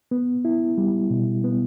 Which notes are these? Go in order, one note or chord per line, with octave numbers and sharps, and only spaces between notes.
B3
E4
G3
B2
B3